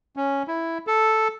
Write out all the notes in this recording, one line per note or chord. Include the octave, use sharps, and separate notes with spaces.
C#4
E4
A4